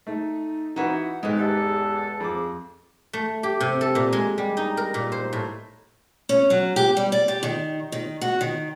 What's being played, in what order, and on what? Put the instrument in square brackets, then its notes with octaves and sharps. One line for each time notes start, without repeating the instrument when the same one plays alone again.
[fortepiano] A3 [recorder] D#4
[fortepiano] E3 F#4 B4 [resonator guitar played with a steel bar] D#4 E4 [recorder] F#5
[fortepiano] G#2 D#3 [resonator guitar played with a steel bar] G#3 B4 [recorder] A4
[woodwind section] E2 A4 [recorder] G4
[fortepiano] F2 D6 [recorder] G#4
[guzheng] A3
G4
C3
A4
A#2
G#3
G3
D#4
A#4
A#2
C5
A2
[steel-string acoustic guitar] C#4
F#3
G4
G3
D5
G4
D#3
D#3
F#4
D#3